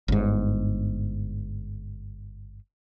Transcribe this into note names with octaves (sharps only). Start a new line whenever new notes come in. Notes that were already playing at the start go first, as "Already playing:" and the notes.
G1 G#2